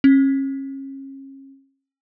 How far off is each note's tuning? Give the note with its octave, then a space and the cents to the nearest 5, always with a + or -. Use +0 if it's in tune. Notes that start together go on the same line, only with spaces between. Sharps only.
C#4 -35